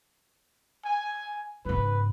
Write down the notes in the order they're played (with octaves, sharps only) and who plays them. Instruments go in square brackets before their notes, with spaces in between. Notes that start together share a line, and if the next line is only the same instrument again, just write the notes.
[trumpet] G#5
[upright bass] G#2 C#3 [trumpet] B4